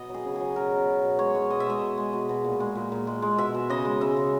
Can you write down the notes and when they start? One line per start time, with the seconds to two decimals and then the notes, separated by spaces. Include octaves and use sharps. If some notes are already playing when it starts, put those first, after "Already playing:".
Already playing: B2 D#5
0.09 F#3
0.14 G#4
0.25 C#3
0.36 F#3 G#4
0.56 B2 A#4
0.72 B2
0.88 B2
1.03 B2
1.19 G#3 C#5
1.35 G#3
1.50 B2 D#5
1.60 E5
1.67 G#3 D#5
1.81 B2
1.97 G#3
2.13 B2
2.29 B2
2.44 A#2
2.60 G#3
2.75 A#2
2.92 A#2
3.07 G#3
3.22 G#3
3.38 B2 E5
3.55 B2
3.70 C#3 D#5
3.85 G#3
4.01 C#3 E5
4.17 C#3